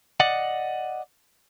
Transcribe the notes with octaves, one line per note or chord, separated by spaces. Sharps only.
D5 D#5 F#5